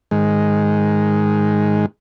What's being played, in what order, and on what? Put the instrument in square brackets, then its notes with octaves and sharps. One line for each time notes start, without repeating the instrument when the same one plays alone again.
[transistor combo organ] G#2 D#3 G#3